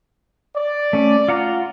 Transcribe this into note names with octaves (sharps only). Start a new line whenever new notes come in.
D5
A3 C#4
F4 F#5 A#5